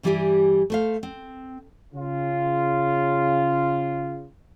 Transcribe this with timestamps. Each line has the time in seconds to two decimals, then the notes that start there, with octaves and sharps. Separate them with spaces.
0.03 G2 E3 G3 E4 G4 G#5
0.70 A3 C5 F5
1.03 C4
1.94 C#3 F4